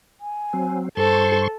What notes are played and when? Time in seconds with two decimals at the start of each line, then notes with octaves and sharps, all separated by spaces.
0.21 G#5
0.53 F#3 C4
0.97 G2 A4 C5 C6 C#6